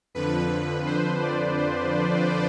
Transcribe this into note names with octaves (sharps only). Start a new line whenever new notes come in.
F2 D3 F3 B4
C5
D5
C5